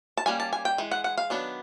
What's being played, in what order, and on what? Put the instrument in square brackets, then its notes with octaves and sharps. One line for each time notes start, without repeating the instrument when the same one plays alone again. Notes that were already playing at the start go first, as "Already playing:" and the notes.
[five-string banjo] A5
G3 A#3 C#4 G#5
A5
G#5
G5
E3 G#3
F#5
F#5
F5
D#3 F#3 B3 D4